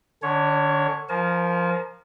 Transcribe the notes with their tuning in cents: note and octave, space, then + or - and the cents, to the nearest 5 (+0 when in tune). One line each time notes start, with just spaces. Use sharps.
D3 +25 D4 -45 C#5 +0
F3 +0 A#4 +0 A5 -45